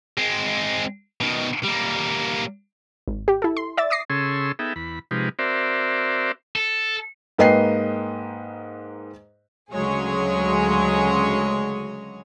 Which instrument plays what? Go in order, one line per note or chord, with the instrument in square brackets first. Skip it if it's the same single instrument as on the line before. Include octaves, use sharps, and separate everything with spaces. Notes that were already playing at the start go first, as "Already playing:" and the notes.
[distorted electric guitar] G#3 C4
B2 D#3
G3 A#3
[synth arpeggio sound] G#1
G4
E4 A4
C6
D5 E5 A6
D6 D#6 A#6 C7
[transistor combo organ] C#3 C#4 G#4 A4 C6 E6
B3 D#4 G#4 A4 E5 G5
E2 B5
C3 F3 G#3 D#4 G4 B4
C4 F#4 A#4 C5 D5 E5
[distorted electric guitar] A4
[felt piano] G#2 A#3 B4 D#5 G5 C7
[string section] D2 C#3 F#3 G#3 G#4 C#5